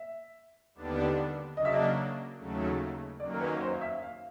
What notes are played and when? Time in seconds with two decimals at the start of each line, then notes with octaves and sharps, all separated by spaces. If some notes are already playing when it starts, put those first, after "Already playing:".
Already playing: E5
0.75 D#2 D3 G3 B3 D4
1.57 C#3 F#3 A#3 D4 D#5
1.65 E5
1.73 D#5
2.38 D#2 C#3 F#3 A3
3.20 F#2 D#3 F#3 A#3 C#4 D5
3.34 A#4
3.40 B4
3.61 C5
3.73 F5
3.81 E5
4.02 F5